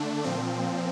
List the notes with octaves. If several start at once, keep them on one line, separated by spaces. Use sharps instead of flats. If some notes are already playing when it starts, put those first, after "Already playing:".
Already playing: D3 A3 D4
A#2 F3 C4